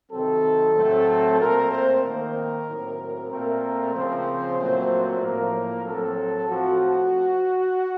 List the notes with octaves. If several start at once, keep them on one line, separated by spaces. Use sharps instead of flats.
C3 D#3 F#3 C4 A4
A2 F#3 A3 C4
A#2 A3 C4 A#4
C5
D#3 A#3 A#4
A2 F#3 C4
A#2 A3 C4 A#4
C#3 F3 C4 C5
A#2 F#3 A3 C4
A2 F3 A#3 A#4
A2 F#3 C4 A4
A2 F3 C4 F#4